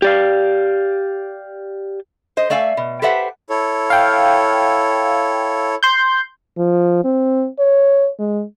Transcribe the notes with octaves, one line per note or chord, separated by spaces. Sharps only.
G4 D5 F5
C5 D#5
A3 D5 E5 F5 G#5
B2
G4 A4 B4 C5 E5 F#5
E4 A4 C#5
F5 G5
C6 G6
F3
C4
C#5
G#3